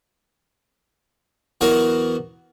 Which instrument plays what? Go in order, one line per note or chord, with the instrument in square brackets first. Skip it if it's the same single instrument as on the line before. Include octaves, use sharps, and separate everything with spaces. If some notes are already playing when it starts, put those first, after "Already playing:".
[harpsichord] E2 F#3 F#4 A#4